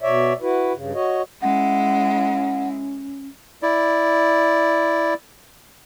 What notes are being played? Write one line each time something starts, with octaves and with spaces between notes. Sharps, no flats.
B2 C#5 D5 E5
E4 F#4 B4
G2 C#3
F#4 C#5 D#5
G#3 C#4 E4 F#5
E4 D5